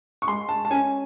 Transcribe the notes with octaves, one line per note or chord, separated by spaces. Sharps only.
C#6
G#3 C6
A5
A5
C#4 G#5